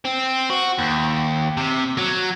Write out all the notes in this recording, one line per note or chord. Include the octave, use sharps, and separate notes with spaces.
C4
F#4
D#2
C3
F#3